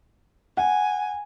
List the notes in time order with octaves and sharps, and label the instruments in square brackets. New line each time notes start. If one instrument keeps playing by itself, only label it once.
[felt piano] F#5 [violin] G#5